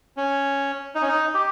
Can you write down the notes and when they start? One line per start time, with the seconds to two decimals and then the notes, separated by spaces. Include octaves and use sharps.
0.17 C#4
0.95 D#4
1.02 C#4
1.08 D#4
1.34 G4